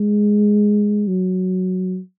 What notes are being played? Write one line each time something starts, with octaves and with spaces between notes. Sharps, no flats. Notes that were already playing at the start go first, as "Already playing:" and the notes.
Already playing: G#3
F#3